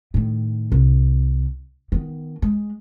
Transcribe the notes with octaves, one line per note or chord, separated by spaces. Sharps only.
A2 D#3
C2
D#3 B3
G#3